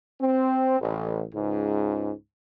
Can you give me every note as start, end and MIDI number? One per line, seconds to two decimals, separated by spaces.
0.21 0.78 60
0.80 1.23 33
1.34 2.12 37
1.34 2.12 44